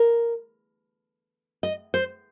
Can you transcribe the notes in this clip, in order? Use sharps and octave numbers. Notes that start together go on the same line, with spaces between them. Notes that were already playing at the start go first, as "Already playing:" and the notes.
Already playing: A#4
D#5
C5